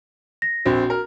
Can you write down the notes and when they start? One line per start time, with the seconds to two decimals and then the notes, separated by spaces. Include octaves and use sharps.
0.42 A#6
0.65 A#1 C4 F#4
0.90 A#4